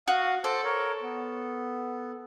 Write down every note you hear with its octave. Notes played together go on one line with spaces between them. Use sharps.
F#4 F5 D#6
A4 C5 A5 D6
A#4 C#5
B3